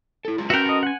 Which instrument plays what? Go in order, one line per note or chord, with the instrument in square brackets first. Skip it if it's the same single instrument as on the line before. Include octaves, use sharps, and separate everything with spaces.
[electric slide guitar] E4 A4
F#3 G#3 F4
[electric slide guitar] C#4 B4 [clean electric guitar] F#4 A#4 [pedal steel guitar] E5 F#5 G5
[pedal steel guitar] A4 D#5
F#5 G#5